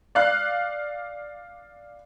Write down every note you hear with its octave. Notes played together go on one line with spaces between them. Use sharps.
D5 F5 F#6